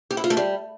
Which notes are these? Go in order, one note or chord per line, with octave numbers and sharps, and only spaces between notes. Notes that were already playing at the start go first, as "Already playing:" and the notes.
G4
E4
F4
A3
G3